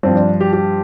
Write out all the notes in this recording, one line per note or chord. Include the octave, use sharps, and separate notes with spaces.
G2 F3 C4
D4
G4
G4